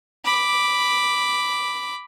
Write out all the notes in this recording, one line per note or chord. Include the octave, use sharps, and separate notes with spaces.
B5 D6